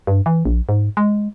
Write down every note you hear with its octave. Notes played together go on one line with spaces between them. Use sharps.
G2
E3
A#1
G#2
G#3